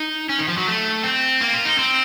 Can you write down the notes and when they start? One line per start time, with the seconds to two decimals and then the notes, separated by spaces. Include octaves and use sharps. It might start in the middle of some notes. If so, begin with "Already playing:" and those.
Already playing: D#4
0.29 C#4
0.39 D#3
0.48 F3
0.58 F#3
0.67 A3
1.03 C4
1.41 A#3
1.53 F4
1.65 D#4
1.79 C4